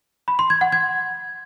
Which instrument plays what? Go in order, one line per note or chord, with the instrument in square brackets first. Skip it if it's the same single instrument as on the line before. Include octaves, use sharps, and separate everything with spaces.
[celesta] B5
C6
G#6
F#5
G#6